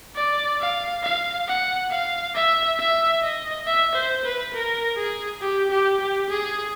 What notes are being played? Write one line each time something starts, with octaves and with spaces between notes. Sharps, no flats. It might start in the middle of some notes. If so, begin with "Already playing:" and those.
D5
F5
F5
F#5
F5
E5
E5
D#5
E5
C5
B4
A#4
G#4
G4
G4
G4
G#4